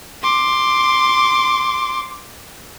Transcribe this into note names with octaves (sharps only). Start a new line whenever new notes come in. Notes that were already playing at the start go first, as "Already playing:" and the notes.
C6 D6